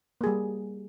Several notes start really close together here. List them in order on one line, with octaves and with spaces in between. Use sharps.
A#3 G#4 G3